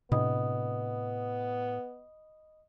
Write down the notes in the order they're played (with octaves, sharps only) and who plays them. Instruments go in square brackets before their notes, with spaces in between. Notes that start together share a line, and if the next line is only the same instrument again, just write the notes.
[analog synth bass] A2 [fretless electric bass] C3 D4 [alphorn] B3 [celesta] D#5 B5 D#6